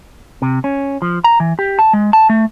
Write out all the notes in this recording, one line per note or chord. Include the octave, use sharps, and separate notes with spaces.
C3
C#4
F3
A#5
E3
G4
A5
G#3
A5
A3